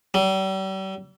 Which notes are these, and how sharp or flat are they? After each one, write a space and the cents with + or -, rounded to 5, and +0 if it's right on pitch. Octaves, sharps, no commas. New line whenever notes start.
G3 -40